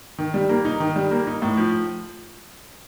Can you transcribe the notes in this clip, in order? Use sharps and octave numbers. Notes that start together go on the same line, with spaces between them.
D#3
G3
A#3
D#4
D#3
G3
A#3
D#4
A2
F3